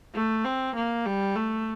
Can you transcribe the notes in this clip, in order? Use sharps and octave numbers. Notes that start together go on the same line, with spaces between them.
A3
C4
A#3
G3
A3